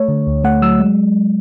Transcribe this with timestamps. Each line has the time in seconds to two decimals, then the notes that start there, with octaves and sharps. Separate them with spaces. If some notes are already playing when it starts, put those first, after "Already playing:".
Already playing: A3 C#5
0.08 D3
0.27 D2
0.44 A3 F#5
0.62 F#3 E6
0.79 G#3